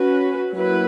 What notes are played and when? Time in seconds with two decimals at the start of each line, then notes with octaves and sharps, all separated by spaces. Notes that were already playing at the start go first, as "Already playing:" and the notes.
Already playing: C#4 F#4 B4
0.53 F#3 A#3 E4 B4